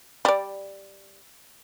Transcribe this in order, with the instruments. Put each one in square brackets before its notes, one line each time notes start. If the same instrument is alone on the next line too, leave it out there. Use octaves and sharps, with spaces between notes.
[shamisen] G3 D5